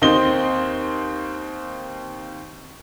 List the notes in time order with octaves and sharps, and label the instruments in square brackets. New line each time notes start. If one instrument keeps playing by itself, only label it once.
[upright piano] D#2 C4 D#5 C6 G7